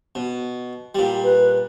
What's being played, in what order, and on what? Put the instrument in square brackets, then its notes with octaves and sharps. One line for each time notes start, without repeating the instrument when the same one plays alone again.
[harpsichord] B2
[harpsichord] A#2 G3 [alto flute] G4
[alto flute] B4